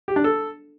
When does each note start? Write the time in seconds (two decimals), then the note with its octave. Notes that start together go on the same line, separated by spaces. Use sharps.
0.08 G4
0.16 D4
0.24 A4